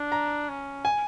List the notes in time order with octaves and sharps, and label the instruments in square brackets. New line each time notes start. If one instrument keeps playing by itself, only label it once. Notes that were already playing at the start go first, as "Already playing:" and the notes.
Already playing: [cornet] D4
[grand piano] A#5
[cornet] C#4
[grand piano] G#5